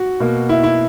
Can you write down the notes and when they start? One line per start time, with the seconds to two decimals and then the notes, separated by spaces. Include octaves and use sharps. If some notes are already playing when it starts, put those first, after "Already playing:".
Already playing: F#4
0.20 B2 A#3
0.49 E4
0.63 E4